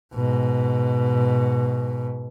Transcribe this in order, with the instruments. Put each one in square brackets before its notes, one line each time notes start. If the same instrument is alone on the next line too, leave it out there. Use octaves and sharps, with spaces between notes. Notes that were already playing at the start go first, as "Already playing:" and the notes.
[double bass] G#2 B2